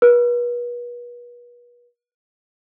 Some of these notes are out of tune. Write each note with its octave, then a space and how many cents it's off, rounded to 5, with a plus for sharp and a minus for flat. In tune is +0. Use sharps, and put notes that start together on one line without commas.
B4 -40